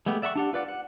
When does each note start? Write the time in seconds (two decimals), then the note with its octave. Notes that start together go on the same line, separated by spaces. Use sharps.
0.06 G#3 A3 B3 G4
0.22 D5 E5 F#5 A#5 C#6
0.36 D4 G4 F#5
0.53 F4 B4 D5 F#5
0.68 F#5